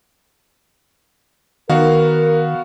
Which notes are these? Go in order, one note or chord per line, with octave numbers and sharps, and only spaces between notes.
D#3 B3 F#4 A#4 F5